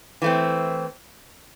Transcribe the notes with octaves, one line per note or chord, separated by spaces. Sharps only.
E3 A3 C4